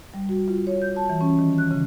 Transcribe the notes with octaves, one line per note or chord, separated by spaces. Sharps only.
G3
F#4
F4
C#5
G6
A5
E3
C#4
D#3
F#6
C#3